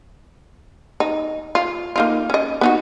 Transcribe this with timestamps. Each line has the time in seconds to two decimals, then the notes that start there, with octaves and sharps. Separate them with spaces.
1.00 D#4
1.55 F4
1.96 A#3 D#4 F4
2.30 C#4 D#5
2.61 B3 D#4 F#4